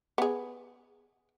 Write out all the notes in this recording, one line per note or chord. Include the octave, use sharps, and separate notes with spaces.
B3 G#4